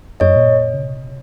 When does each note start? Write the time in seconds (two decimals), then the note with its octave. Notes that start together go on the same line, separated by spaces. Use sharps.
0.20 F#2 C#5 D#5
0.36 A#2
0.74 C#3
0.85 C3